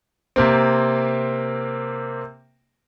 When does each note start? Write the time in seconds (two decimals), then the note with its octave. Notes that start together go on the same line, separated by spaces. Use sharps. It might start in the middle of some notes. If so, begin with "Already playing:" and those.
0.36 C3 A#3 C4